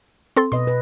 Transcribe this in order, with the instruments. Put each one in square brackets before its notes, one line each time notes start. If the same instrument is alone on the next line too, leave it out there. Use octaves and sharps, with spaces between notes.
[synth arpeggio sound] C4 A4 C6
[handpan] B2 B4 D#5 [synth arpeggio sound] C6
[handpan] B4